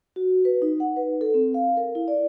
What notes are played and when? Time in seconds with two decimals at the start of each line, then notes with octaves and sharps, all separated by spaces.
0.16 F#4
0.45 B4
0.62 D#4
0.80 F#5
0.96 B4
1.21 A4
1.34 C4
1.54 F5
1.77 A#4
1.95 E4
2.08 D5